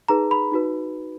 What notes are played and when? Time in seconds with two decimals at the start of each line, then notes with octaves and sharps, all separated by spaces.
0.08 D#4 G#4 B4 A#5
0.31 B5
0.52 D#4 F#4 B4